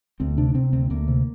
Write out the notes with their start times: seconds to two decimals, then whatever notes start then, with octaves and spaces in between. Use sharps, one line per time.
0.20 D2 C4
0.37 C3 D4
0.55 C3 C4
0.73 D2 C4
0.90 D2 A#3
1.08 C3